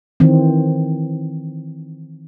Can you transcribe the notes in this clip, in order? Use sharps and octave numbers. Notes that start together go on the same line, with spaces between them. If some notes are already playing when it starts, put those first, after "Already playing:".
D#3 E3 C4